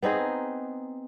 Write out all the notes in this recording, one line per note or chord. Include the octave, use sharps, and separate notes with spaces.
B3 C4 D#4 G#4